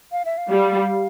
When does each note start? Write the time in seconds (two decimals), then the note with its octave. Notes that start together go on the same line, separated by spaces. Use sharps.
0.12 F5
0.25 E5
0.37 F5
0.50 G3